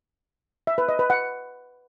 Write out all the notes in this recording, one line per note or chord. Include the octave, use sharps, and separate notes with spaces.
E5
B4
D#5
B4
F#5